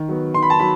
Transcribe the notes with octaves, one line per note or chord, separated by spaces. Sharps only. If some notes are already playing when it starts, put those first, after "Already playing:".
Already playing: D#3
F#3 B3
D#3 C6
B5
A5
F#3 B5